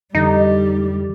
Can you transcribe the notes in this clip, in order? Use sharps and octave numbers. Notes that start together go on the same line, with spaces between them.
F2 D3 E3 G3 D#4